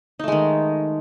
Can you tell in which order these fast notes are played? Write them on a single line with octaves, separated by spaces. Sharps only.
D#4 A3 G#3 D#3